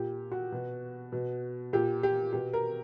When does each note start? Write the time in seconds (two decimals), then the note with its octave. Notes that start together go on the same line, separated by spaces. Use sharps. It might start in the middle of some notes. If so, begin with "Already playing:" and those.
Already playing: A#2 G4
0.32 F#4
0.52 B2
1.12 B2
1.73 A#2 G4
2.03 G4
2.33 B2 G4
2.53 A#4